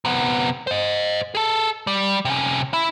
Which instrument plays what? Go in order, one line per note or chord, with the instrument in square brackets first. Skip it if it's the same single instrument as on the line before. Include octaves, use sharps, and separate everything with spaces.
[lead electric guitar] C3 B3
C5 D#5
G#4 A4
G3
C3 C#4
E4